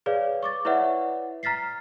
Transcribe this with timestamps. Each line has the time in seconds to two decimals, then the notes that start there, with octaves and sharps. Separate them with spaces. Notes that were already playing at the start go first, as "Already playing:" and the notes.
0.06 G#4 B4 C#5 D5 F5
0.43 C#6 D6 A6
0.65 E4 B4 C#5 D5 E5 F#5
1.43 A#5 F6 A6 B6 C7